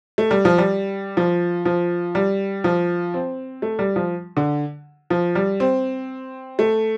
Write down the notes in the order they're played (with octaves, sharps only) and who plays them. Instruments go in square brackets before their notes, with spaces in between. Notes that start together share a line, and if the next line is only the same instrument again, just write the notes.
[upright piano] A3
G3
F3
G3
F3
F3
G3
F3
C4
A3
G3
F3
D3
F3
G3
C4
A3